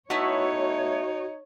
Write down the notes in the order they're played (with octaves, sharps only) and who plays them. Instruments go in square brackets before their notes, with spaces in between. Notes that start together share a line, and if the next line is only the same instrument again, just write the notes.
[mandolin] A3 B3 E4 [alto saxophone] D#4 [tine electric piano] F#4 [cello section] C#5